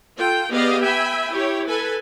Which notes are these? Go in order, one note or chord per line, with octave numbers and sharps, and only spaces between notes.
F4 A4 G5
B3 G4 G#4 D5 D#5 F5
E5 G5 G#5 B5
E4 G4 C#5
A4 B4 G#5